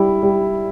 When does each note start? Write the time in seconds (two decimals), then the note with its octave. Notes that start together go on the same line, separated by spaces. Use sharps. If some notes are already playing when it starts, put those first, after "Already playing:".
Already playing: G3 E4
0.23 G3